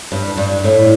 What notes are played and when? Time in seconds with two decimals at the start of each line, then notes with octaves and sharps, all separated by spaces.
0.12 G2
0.37 G2
0.64 A2